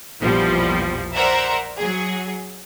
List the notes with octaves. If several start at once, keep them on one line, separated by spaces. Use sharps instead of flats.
A#1 E2 B2 F3 G3
A#4 C5 D5 E5 F#5 A#5
F#3 G#4